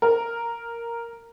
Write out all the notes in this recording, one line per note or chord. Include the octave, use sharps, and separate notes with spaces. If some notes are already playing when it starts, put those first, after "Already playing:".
A#4